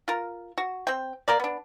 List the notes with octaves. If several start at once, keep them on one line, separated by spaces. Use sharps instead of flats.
F4 A#4
F#4
C4 G5
A#3 A#4 D5
B3 D4